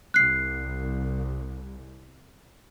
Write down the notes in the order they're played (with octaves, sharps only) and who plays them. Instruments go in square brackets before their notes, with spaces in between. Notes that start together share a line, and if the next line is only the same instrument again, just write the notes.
[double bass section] C2 [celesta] F#6 C7